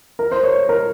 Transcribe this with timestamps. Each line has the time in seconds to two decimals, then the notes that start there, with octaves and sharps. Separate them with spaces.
0.19 A#4
0.32 C5
0.44 C#5
0.69 A#4